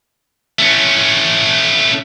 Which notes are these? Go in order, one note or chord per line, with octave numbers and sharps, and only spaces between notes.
A3 C#4